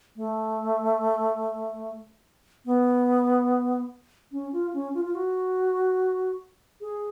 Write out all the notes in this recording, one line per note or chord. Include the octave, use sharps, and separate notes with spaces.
A3
B3
C#4
F4
C#4
F4
F4
F#4
G#4